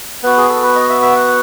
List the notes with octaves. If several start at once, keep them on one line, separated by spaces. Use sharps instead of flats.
B3 F#4 B4
G#4
A4
B4
D#5
E5
E5
F#5